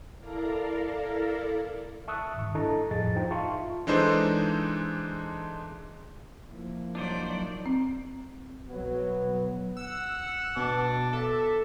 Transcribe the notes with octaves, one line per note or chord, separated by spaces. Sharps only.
E4 A4 A#4 D5 F5 A#5
E5 A5 C#6 D#6 E6 F#6
G#2 D#3 C#6
D4 E4 A4 D#5 A5 A#5
F2 A2 F3 G#4 D#5 A6
D#4 F4 C5 G5 A#5
F4 E5 F5 A5 C6 C#6
E3 G#3 D4 D#4 A4 C5
F3 A#3 E4
F#3 D4 D#4 C5 D5
C4
B1 F#3 B3
F#5 E6
B2 A5 D6
A4 E5